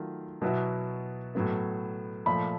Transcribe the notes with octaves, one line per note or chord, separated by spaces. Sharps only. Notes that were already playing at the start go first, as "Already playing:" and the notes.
Already playing: D#3 F#3 A3 F4
B2 F#3 B3 E4
A2 F#3 B3
A#2 F3 A3 B5